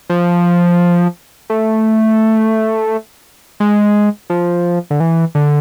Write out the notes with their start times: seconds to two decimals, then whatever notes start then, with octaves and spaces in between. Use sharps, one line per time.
0.09 F3
1.50 A3
3.60 G#3
4.30 F3
4.90 D3
5.00 E3
5.35 D3